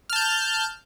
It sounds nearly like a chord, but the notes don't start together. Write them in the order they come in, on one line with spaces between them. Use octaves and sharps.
F6 A5 G6